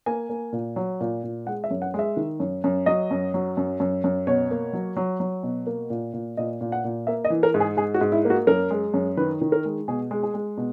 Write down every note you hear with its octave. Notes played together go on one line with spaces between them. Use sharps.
A#3 G#5
A#3
A#2
F#3
A#2
A#2
G#3 F#5
E5
F#2
F#5
G#3 E5
D#3
F#2
F#2
F#3 D#5
F#2
F#3
F#2
F#2
F#2
B2 C#5
A#3
F#3
F#3
F#3
B2
A#3
A#2
A#2
A#2 D#5
A#2
F#5
A#2
A#3 E5
D#5
E3
A#4
G#2
G#4
G#2 G#4
F#4
G#2
E4
A#3
F#4
F#2 A#4
G#3
F#2
D#3 B4
D#3
A#4
G#3
B2 G#4
G#3
G#4
G#3
B2